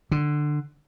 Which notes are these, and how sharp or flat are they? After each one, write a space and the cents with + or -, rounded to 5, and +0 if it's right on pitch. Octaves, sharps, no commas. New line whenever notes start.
D3 +15